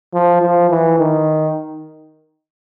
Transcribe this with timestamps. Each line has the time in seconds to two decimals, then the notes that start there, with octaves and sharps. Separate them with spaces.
0.14 F3
0.42 F3
0.70 E3
0.98 D#3